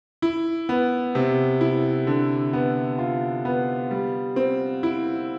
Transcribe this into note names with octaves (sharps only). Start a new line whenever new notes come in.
E4
B3
C3
E4
D3
B3
F4
B3
G3
C4
E4